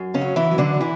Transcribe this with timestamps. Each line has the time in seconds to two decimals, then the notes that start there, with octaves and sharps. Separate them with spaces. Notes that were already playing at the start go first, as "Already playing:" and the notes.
Already playing: F#2
0.14 C#3 C#4
0.21 F#3
0.36 E3 E4
0.51 F#3
0.58 D3 D4
0.80 E3 E4